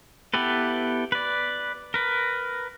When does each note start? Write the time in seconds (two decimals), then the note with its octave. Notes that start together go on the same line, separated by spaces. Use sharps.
0.34 B3 E4 G4 A4 B4
1.12 B4 D5
1.94 A#4 B4